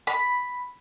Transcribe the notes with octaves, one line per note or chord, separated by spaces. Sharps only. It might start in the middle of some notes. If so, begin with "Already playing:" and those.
B5